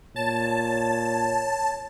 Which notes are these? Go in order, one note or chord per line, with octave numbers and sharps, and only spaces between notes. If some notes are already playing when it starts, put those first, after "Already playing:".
A#2 C#5 A5